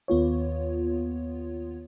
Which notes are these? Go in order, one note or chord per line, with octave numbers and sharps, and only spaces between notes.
D#2 B3 F4 C#5